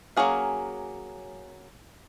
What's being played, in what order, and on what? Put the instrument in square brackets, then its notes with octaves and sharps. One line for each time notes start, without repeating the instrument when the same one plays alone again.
[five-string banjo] F#3 A#3 C#4 G#4 F5